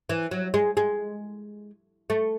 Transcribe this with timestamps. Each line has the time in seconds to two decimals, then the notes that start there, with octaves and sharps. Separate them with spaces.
0.09 E3
0.31 F#3
0.54 G#3
0.77 G#3
2.10 A3